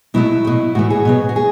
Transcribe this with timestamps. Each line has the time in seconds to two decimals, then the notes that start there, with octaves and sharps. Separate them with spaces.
0.14 B2 F#3 A3 E4
0.45 B2 A3
0.75 A2 E3 A3 F#4
0.90 G#4
1.05 B2 F#3 B3
1.29 F#4
1.36 G#4